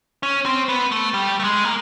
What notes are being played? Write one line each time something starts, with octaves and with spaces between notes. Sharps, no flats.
C#4
C4
B3
A3
G3
A3
G#3
A#3